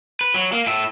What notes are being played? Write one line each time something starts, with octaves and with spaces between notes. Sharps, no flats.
B4
F#3
A#3
A2 E5